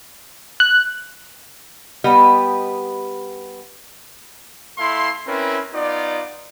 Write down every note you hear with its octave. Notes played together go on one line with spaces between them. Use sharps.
F#6
G3 B3 G4 D#5
A3 E4 F5 C6
C4 C#4 E4 A#4 B4
B3 D#4 F4 D5